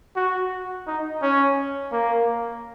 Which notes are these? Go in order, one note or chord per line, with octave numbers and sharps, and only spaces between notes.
F#4
D#4
C#4
A#3